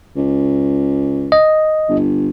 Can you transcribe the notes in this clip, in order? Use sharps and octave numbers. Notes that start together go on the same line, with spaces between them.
C#2
D#5
G1